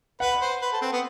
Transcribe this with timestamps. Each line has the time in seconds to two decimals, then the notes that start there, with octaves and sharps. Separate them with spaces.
0.20 B4 F#5
0.41 C5
0.62 B4
0.72 A4
0.82 C4
0.93 B3